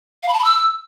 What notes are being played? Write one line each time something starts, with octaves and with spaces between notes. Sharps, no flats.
F5
B5
A5
B5
E6